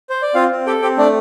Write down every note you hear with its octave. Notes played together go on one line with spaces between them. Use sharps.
C5
D5
C4 F4 F5
C4
G4 A4 G5
C4 G4 G5
A3 D4 D5